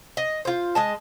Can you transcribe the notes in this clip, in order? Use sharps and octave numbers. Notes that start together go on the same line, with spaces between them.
D#5
F4 C5
G#3 D#5 A5